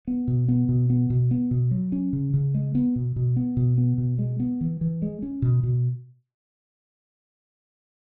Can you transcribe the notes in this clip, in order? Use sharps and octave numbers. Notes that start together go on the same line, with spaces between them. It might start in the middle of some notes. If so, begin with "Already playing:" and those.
B3
B2
B3
B2
B3
B2
B3
B2
F#3
C#4
C#3
C#3
G#3
B3
B2
B2
B3
B2
B3
B2
G#3
B3
E3
E3
G#3
C#4
B2
B2